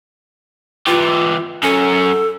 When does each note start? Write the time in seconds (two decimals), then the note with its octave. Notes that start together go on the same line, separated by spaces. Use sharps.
0.87 E3 F4 G4
1.63 F#2 C#4 A4